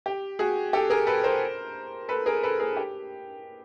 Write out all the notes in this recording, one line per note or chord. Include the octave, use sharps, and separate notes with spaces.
G4
F#4 G#4
G4 A4
G#4 A#4
A4 B4
A#4 C5
A4 B4
G#4 A#4
A4 B4
G#4 A#4
G4